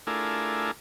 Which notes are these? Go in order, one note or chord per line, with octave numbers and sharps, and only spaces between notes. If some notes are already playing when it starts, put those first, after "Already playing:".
A3 D4 E4 F4 G#4 A#4